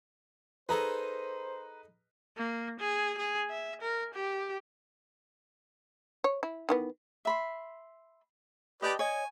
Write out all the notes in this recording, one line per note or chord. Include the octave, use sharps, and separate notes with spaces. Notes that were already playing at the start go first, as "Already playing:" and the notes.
D#4 G#4 A4 B4 C5 A#5
A#3
G#4
G#4
E5
A#4
G4
C#5
E4
D#3 E3 B3
E5 B5 C6
G4 B4 D5 D#5 G5 A5
C#5 D#5 G#5